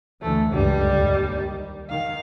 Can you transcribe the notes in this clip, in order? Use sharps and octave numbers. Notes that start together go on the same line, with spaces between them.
D2 E3 A3
C#2 G2 D3 G3
D#2 D#3
D#3 F5